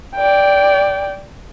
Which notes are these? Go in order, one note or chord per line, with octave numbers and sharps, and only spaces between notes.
D5 G5